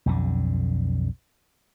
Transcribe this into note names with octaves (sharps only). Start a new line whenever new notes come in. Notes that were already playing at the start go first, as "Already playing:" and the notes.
B1 F2 D3